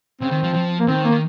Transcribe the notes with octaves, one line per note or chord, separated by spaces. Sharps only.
C#3 C4
D#3
F3
F3
A#3
D#3 C4
A#3
D#3